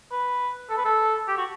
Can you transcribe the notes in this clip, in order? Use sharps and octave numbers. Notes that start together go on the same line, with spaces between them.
B4
A4
B4
A4
G4
F#4